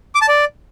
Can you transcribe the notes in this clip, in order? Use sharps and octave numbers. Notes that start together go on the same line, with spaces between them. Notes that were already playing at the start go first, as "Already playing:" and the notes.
D6
A5
D5